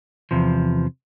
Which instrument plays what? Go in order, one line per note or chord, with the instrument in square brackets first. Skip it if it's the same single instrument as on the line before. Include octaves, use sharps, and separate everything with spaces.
[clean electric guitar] E2 C3 F3